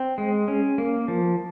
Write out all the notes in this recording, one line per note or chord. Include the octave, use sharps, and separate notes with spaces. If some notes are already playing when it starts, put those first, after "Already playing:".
Already playing: C4
G#3
C#4
A#3
F3